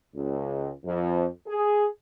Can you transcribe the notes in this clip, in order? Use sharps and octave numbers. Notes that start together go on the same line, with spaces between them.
C#2
F2
G#4